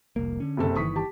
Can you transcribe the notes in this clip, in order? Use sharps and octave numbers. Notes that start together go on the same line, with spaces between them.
F1 C2 A#3
D3 C#4
F#1 C3 A4
G1 D#3 E3 C#6 D#6 B6
G4 A5